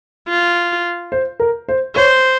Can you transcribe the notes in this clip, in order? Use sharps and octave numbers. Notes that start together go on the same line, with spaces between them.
F4
C5
A#4
C5
C5 C#5